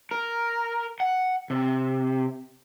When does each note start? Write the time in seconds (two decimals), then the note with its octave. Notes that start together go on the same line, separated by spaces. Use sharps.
0.11 A#4
1.00 F#5
1.50 C3